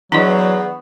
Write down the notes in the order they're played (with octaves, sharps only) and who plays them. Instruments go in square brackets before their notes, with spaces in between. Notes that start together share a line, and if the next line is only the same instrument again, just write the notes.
[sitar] E2 [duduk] F#3 [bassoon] B3 [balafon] D4 E4 D#5